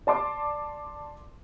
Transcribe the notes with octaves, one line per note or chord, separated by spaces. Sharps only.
D5 A5 C6 D6